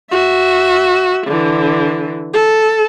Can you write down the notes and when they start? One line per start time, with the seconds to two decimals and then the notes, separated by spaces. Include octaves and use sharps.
0.11 F#4 E5
1.27 D3 E3
2.33 A4